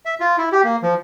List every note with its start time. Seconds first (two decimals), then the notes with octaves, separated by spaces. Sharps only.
0.05 E5
0.20 F4
0.38 E4
0.52 G4
0.64 A#3
0.83 F3